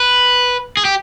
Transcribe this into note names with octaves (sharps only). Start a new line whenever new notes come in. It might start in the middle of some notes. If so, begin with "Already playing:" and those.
Already playing: B4
G#4
G4